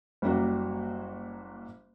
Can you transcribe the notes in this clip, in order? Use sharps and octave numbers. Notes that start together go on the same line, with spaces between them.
F#1 G3 A#3 F#4